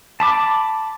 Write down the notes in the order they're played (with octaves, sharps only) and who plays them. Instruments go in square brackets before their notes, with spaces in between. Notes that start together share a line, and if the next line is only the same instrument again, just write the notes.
[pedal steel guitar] A5 B5 D6